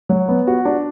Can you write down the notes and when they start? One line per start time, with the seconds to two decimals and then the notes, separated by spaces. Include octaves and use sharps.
0.09 F#3
0.28 B3
0.47 F#4
0.65 D4